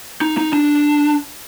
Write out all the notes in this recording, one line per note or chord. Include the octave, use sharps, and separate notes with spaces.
D#4
D#4
D4